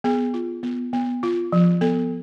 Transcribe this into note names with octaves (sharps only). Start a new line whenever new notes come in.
B3 G#4
F4
B3
B3
F4
F3
B3 A4